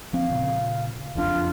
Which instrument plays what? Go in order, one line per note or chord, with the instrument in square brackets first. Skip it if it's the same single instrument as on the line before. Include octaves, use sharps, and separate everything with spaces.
[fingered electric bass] F3 C4 [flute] F5
[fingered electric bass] A#2 C#3
[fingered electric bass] F#1 F2 D4 [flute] F4